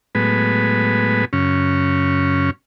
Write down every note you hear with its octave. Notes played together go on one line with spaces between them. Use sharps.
A2 F#3 G#3 B3 B4
F#2 C#3 C#4